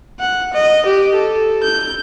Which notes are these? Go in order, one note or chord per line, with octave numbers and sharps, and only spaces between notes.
F#5
D#5
G4
A4
G6